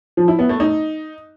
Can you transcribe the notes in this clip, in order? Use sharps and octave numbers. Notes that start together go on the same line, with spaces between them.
F3
E4
B3
A3
D#4